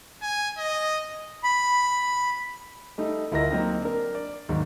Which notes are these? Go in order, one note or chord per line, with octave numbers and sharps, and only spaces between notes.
G#5
D#5
B5
G3 A3 D#4
D2 E4 F4 A#4 D#5 A#6
F#3 A#3 C4 D#4
D4 A#4
D5
D#2 G#2 D#3 F#3